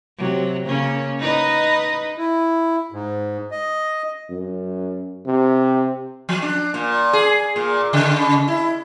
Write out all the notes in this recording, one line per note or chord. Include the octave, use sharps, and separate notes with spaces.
C3 F#3
C#3 A#3 C#4
D#4 B4 D#5
E4
G#2
D#5
F#2
C3
F3
D4
A#2
G#4
A#2
C#3
E4